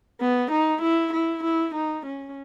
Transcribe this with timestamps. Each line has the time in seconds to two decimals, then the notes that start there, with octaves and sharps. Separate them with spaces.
0.21 B3
0.52 D#4
0.82 E4
1.13 E4
1.44 E4
1.75 D#4
2.06 C#4